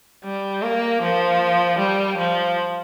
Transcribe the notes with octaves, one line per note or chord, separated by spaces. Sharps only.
G3
A#3
F3
G3
F3